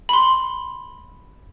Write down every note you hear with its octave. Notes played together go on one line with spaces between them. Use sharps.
B5
C6